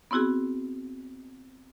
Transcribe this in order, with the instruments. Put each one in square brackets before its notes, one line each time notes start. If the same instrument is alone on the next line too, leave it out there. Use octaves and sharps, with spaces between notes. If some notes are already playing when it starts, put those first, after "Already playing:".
[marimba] B3 C4 E4 F#4 G#4